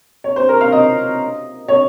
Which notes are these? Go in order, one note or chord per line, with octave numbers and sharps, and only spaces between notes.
C#5
C5
A#4
F5
D#5
C#5